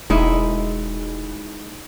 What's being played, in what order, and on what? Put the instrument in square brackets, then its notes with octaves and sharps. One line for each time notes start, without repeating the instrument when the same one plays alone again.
[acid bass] E1 [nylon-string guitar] G#3 D#4 E4